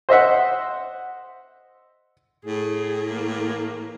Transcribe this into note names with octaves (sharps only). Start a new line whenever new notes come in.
C5 D#5 E5 F#5
A2 G#4
E3 A#3